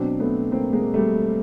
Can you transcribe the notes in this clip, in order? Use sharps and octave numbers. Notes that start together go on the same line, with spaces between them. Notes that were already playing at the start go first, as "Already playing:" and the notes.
Already playing: B2 F#3 C4 D4
A3 B3
A#3 C4
G#3 A#3
G3 A3